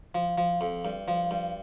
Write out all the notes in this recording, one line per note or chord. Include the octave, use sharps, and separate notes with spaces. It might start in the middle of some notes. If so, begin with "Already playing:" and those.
F3
F3
F2
G2
F3
G2